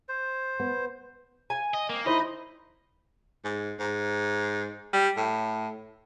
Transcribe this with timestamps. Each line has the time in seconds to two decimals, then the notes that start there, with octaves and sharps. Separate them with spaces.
0.09 C5
0.60 B3
1.50 G#5
1.74 D#5
1.90 A#3 C4
2.06 D#4 E4 C5 D#5 B5
3.45 G#2
3.80 G#2
4.94 G3
5.17 A2